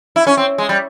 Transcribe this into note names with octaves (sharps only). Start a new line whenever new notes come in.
E4
C#4
C4
G#3
G3